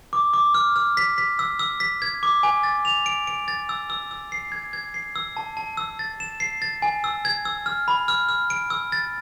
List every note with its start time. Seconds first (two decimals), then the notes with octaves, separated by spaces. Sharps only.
0.13 D6
0.34 D6
0.55 F6
0.76 F6
0.97 B6
1.18 B6
1.39 E6
1.59 E6
1.80 B6
2.02 G#6
2.23 D6
2.43 G#5
2.63 A6
2.85 F7
3.06 D7
3.27 D7
3.48 A6
3.69 E6
3.90 E6
4.11 E6
4.32 C7
4.52 G#6
4.73 G#6
4.94 C7
5.16 E6
5.37 A5
5.57 A5
5.77 E6
5.99 A6
6.20 E7
6.40 C7
6.62 A6
6.82 G#5
7.04 E6
7.25 G#6
7.45 E6
7.66 F6
7.88 B5
8.08 F6
8.29 F6
8.50 D7
8.70 E6
8.92 A6